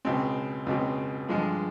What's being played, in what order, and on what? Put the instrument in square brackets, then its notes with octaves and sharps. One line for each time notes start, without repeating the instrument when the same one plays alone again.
[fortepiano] C#2 B2 G#3 C4
C#2 B2 G#3 C4
G2 D3 F3 G#3